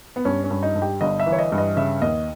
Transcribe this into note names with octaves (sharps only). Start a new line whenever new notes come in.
B3
G2 C#4
C#4
G2
D#4
G2
G4
G1 D#5
E5
E3
C#5
D#5
G2
D#5
C#3 E5
D#2 D#5